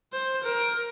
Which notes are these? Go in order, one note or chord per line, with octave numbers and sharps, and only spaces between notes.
C5
A#4